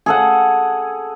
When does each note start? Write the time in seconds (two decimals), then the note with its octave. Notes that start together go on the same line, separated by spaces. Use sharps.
0.06 G#4 A4 F#5